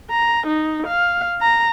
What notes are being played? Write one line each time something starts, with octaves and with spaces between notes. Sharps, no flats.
A#5
D#4
F5
A#5